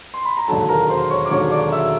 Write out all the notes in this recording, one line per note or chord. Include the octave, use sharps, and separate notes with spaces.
C6
B5
A#5
E1 D#2 D3 F#3 A4 A5
A#4 A#5
C5 C6
C#5 C#6
D6
E1 D#2 D3 F#3 C#5 C#6
D5 D6
E5 E6